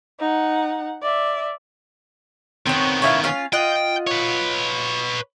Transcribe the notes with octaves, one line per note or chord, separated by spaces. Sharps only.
D#4 F#5
D5 E5
D#3 B3 C4 C#5
C#4 E4 F5
C#4 F4 F5
F4 D#5 F#5 G5
B4 C#5